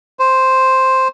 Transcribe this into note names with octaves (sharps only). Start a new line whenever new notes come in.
C5